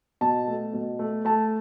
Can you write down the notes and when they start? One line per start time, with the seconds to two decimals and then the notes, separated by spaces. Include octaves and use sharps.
0.21 B2 A5
0.48 A3
0.74 B2
0.99 A3
1.25 A3 A5